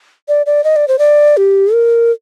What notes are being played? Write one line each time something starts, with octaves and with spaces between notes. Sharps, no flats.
D5
D5
D#5
D5
C5
D5
G4
A#4